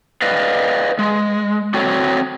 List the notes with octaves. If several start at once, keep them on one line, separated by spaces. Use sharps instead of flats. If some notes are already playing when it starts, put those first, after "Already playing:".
B4 D5 D#5 F5
G#3
C4 F#4 A4 C#5